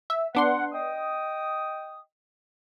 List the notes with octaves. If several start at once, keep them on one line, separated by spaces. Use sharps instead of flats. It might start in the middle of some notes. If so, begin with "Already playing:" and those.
E5
B3 D4 F#5 C6
D#5 G5 D#6